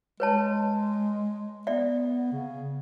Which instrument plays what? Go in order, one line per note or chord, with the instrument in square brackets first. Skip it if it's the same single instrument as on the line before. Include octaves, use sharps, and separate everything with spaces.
[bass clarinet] G#3 [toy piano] B4 C#5 A5
[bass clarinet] B3 [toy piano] D5 E5
[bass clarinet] C#3